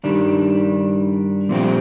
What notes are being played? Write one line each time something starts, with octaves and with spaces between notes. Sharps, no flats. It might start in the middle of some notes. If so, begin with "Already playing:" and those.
G2 D#3 G3 D4
A#2 F3 C4 G4